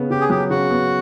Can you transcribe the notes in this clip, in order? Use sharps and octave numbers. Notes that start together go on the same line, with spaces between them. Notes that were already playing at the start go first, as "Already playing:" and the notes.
Already playing: C#3 B3
C#3 G4
G#4
F#3 G4
C#3 F#4
B3